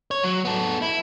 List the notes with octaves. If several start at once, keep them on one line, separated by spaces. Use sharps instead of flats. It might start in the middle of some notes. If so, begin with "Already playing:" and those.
C#5
F#3
B3 A4
E4